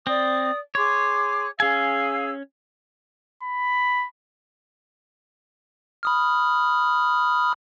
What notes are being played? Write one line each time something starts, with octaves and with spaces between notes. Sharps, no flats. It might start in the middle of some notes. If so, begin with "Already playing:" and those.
C4 D5 D#6
G#4 C#5 C6 D6
C#4 G#4 F5 G#5 E6
B5
B5 D#6 F6